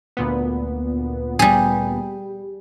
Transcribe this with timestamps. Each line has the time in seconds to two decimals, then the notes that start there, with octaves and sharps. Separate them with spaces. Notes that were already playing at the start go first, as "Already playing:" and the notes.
0.17 D2 A#2 B3
1.39 G3 G#4